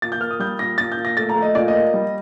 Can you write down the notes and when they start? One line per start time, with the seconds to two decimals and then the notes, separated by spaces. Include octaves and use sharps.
0.02 A#2 A6
0.12 G6
0.20 A#3 F6
0.31 D#6
0.39 G3 G6
0.59 A#2 A#6
0.78 A#2 A6
0.92 G6
0.97 A#2
1.05 A#6
1.17 A3 A6
1.29 A#5
1.35 A3
1.42 D#5
1.55 A#2 D5
1.68 D#5
1.75 A#3
1.94 G3